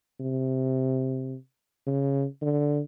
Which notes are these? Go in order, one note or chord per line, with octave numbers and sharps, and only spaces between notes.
C3
C#3
D3